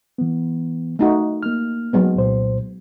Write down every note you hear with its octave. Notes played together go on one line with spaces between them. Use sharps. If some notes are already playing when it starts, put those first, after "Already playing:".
E3 B3
A3 D#4 F#4
A#3 F6
F#3 G#3 B3
C2 A#2 C5